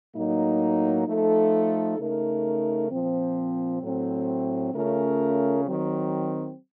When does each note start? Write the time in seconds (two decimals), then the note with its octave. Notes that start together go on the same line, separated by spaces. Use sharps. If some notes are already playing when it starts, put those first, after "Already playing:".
0.15 A2 F#3 A#3 D#4
1.07 F3 A3 D#4 A4
1.99 C#3 A3 D#4 A#4
2.91 A#2 F3 C4
3.82 A2 F#3 A3 C4
4.74 C#3 A3 C#4 F4 A#4
5.65 D#3 F#3 C4